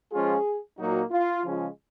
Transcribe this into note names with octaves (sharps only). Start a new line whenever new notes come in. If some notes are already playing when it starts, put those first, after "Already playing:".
F3 G#3 C#4 F4 G#4
A#2 F#3 A#3 D#4 F#4
F4
C#3 F3 G#3 C#4 F4